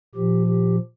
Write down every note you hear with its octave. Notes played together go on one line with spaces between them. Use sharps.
A#2 F3 G4
G4